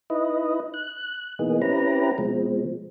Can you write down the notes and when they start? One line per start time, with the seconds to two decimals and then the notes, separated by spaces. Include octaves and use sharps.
0.10 D#4 E4 B4 D#5
0.74 F#6
1.39 B2 E3 A#3 B3 D#4 G#4
1.62 C4 C#4 E4 G4 B4 A#5
2.18 B2 F3 G#3 C4